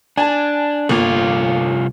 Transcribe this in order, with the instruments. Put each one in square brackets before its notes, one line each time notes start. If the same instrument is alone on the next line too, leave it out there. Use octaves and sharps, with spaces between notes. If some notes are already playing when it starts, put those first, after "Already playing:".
[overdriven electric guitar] D4 [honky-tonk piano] G#5 A5
[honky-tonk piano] G1 A#3 [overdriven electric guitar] C2 F4